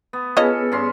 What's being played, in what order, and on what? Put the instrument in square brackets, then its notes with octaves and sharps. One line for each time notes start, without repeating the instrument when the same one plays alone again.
[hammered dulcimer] B3
[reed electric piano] B3 G#4 B4 [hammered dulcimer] C#4 A4 [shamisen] F4 C#5 D#5
[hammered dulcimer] G2 C#4 C6